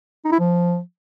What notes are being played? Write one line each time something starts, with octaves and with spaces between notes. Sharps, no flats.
D#4
E4
F3